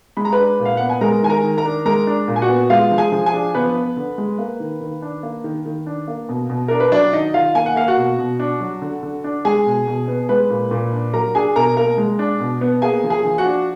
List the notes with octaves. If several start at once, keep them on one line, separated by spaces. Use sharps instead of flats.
G#3 B5
A#5
B4 B5
D4
A#2
F5
B3 F#5
G#5
G#3 A#4 A#5
D#3 G#5
A#4 A#5
D#3
A#4 A#5
D4
G#3 A#4 A#5
D4
A#2
G#5
F#4 F#5
B3
G#3 F4 F5
F3
G#4 G#5
F3
G#4 G#5
D4
F3 B3 B4
B3
D3
G#3
A#3
D#3
D#3
D4
A#3
D#3
D#3
D4
A#3
B2
B2
D4 A#4
B4
F#3 D4 D5
D#3 D#4 D#5
D#3 F4 F5
A#3 G#5
F#5
A#3 F5
F#4 F#5
B2
B2
D4
F#3
D3
D3
D4
G#3 G#4 G#5
B2
B2
B3
G#3 B4 B5
A#2
A#2
D4
F#3 A#4 A#5
D4 G#4 G#5
B2 A#4 A#5
A#3 A#4 A#5
G#3
D4
B2
B3
A#3 G#4 G#5
F3
G#4 G#5
F3
F#4 F#5
D4